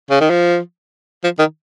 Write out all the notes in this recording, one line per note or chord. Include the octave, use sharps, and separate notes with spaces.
C#3
D#3
F3
F3
D#3